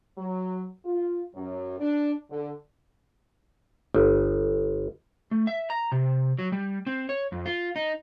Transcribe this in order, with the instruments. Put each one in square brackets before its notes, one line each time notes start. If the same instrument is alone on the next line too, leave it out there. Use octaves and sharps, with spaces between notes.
[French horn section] F#3
F4
F#2
D4
D3
[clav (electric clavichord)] G1
[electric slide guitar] A3
E5
A#5
C3
F#3
G3
C4
C#5
F2
F4
D#4